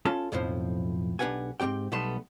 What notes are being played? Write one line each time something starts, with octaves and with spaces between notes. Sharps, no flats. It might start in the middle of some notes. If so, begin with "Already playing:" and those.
C#4 F4 A4 A5
B1 F2 A2 F3 C5
B1 D4 G4 B4 F#5 G#5
G#2 D#3 C4 G4 G5
B1 G3 A3 B3 A5 C6